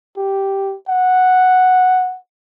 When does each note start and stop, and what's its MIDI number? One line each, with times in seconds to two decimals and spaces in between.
0.17 0.75 67
0.89 2.17 78